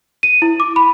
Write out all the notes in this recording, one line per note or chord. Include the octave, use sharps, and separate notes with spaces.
D#7
E4
D6
B5